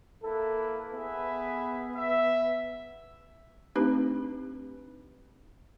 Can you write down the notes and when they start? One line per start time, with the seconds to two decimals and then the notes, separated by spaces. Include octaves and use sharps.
0.23 A#3 E4 A4 B4
0.93 B3 G#4 B4 E5
1.96 E5
3.75 A3 C4 D4 D#4 G4 B4